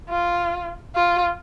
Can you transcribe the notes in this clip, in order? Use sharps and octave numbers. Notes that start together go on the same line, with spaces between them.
F4
F4